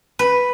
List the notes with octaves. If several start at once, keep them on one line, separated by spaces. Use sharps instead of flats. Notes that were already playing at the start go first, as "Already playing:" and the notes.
B4